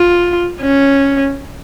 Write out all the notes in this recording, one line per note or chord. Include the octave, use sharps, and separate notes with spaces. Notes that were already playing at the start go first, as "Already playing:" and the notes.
Already playing: F4
C#4